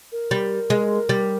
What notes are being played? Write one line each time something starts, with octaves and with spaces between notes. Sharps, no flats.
A#4
G3
G#3
G3